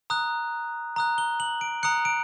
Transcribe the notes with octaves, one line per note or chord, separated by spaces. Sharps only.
A#5 D#6 F#6
A#5 D#6 F#6
G7
F#7
D7
A#5 D#6 F#6 C#7
D7